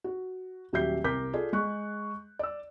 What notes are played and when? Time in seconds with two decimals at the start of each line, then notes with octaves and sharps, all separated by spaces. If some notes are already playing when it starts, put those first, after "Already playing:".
0.04 F#4
0.73 D#1 F#3 G4 E5 G6 C7
1.04 C2 A#4 D6 G6 B6
1.33 F4 G#4 A4 D5
1.53 G#3 G#4 C#6 F#6
2.39 D5 E6